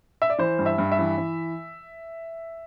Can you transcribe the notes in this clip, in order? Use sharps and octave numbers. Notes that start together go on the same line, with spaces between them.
E5
D5
E3 C5
G2
E5
G2
E5
E3
E3